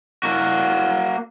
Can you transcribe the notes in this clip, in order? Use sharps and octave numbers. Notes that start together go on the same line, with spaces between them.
A#3 F#4